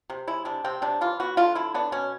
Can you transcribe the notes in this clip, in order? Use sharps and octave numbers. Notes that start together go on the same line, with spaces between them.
C3
G#3 E4
C3 D4
C3 C4
C3 D4
E3 F4
B3 F#4
D3 F4
D3 E4
B3 D4
B2 C#4